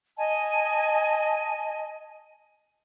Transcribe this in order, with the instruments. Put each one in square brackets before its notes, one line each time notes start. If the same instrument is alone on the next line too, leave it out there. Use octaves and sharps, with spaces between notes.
[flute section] D#5 G#5 A5